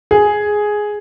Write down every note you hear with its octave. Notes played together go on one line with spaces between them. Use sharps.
G#4